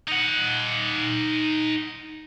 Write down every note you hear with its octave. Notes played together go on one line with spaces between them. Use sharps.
D#4 F#5